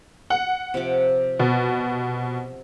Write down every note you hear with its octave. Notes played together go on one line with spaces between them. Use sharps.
F#5
C3 F3 D6
B2